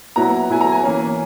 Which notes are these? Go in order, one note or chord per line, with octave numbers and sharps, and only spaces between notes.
A#2 F#3 B3 E4 A#5
A#2 F#3 B3 E4 G#5
A#5
G#5
E3 A#3 C#4